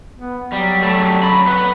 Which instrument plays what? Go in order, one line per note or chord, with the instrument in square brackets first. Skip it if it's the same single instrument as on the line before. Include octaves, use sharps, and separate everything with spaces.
[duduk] B3
[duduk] F#3 [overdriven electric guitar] G3
[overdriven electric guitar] G3 A3
C#4 B5
B4 F#5